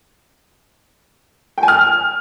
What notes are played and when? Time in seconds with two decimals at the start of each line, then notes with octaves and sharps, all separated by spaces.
1.58 G5
1.63 G#5
1.68 F6